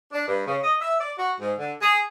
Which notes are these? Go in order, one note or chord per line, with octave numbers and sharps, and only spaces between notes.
D4
G2
C#3
D#5
E5
D5
F#4
G#2
D3
G#4